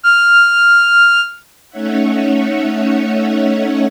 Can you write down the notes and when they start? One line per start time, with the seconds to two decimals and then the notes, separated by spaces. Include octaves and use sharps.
0.03 F6
1.70 A3 C#4 D#4 C#5 E5 F#5